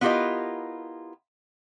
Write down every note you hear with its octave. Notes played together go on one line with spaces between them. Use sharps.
B3 E4 F4 G4 A#4 D#5